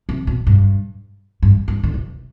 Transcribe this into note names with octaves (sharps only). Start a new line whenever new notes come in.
C3
B2
G2
G2
G2
D3
C3